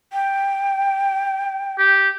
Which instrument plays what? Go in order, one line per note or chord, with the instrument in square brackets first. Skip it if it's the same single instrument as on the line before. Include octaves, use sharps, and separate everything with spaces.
[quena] G5
[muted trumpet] G4